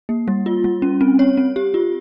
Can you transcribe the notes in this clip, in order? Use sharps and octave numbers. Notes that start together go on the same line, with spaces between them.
A#3
G3
F4
G3
C#4
C4
C#5
C4
G4
F4